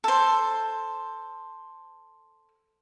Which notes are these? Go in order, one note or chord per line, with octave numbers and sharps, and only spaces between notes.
A4 C5